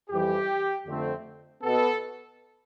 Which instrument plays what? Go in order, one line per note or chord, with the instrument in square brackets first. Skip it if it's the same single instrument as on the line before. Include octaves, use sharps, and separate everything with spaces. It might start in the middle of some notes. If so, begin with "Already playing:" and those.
[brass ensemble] F2 E3 G3 G4
F2 D3 A3 C4
B2 B3 A4